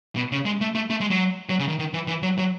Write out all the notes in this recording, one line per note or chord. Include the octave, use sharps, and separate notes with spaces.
B2
C#3
G#3
A3
A3
A3
G#3
F#3
F#3
C#3
D#3
D#3
E3
E3
F#3
F#3